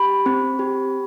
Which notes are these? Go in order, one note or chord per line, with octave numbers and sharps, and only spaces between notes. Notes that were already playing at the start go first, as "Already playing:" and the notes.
Already playing: G4 B5
C4
G4